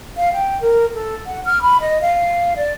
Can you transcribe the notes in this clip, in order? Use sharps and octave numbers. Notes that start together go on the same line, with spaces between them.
F5
G5
A#4
A4
F#5
F6
B5
D#5
F5
D5